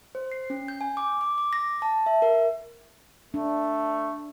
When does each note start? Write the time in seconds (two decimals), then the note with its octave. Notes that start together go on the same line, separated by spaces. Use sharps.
0.15 C5
0.32 C7
0.50 C#4
0.68 G6
0.81 G#5
0.97 D6
1.21 D6
1.38 D6
1.53 A#6
1.82 A5
2.06 E5
2.22 A#4
3.34 A3 D4